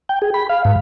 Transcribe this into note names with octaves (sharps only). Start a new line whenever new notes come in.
G5
G#4
B5
F5
G#2